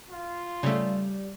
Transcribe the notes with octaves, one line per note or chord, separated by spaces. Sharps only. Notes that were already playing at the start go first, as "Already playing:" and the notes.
F4
C#3 G3 A3